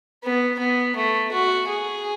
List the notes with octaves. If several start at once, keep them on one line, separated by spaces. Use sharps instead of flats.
B3
B3
A3
F#4
G#4